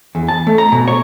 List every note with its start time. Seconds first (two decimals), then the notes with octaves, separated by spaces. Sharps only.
0.15 E2
0.29 A5
0.47 A3
0.58 A#5
0.72 B2
0.88 C#5